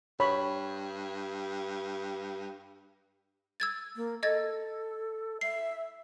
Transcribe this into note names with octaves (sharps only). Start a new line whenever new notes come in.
G2 C#5 B5
E6 G#6 A6
A#3
A4 D#5 G#6 A6
E5 C7